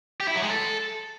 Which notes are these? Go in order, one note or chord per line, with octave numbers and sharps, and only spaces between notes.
G4
E4
F#3
G#3
A4